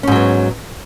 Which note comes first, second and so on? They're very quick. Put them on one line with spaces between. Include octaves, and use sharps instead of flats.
C#4 G#2 F#3 B3